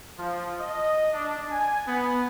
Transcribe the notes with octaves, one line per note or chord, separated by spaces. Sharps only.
F3
D#5
D4
G#5
B3